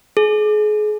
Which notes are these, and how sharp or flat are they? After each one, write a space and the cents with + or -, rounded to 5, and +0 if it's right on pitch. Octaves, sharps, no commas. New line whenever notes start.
G#4 +35